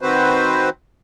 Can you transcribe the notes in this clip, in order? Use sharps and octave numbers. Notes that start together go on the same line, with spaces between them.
D#3 C4 F#4 B4 C5